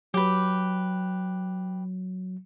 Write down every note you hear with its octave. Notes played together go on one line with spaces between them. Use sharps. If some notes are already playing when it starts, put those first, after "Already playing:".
F#3 G4 B4